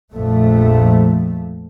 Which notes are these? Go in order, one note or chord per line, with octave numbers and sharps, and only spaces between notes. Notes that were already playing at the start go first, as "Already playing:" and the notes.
A#1 F2 A3